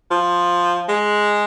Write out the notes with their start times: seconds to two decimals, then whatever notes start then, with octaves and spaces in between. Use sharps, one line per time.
0.11 F3
0.89 G#3